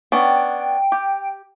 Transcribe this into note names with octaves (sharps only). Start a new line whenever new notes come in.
B3 C#4 D4 G5
G4